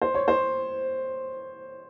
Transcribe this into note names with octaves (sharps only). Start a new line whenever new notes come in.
C5
C#5
C5